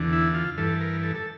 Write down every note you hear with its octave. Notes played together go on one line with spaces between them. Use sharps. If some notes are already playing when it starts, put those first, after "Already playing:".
Already playing: E2 D3
E4
F4
G2 E3 A4
A#4
A4
A4